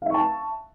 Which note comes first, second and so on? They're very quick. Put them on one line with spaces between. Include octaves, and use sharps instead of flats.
F5 E5 C#6 A5